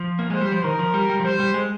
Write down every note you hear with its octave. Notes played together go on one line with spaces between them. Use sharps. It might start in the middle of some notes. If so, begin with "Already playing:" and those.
Already playing: F3
A#3
G#3 C5
G3
F3
D#3 A#4
F3
G3
G3
F3
G3 C5
G3
G#3